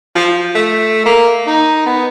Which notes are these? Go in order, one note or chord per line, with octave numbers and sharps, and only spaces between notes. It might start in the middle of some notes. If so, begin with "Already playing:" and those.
F3
A3
A#3
D#4
B3